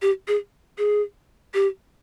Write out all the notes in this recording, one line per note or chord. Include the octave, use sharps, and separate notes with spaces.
G4
G#4
G#4
G4